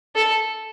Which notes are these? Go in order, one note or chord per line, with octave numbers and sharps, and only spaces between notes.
A4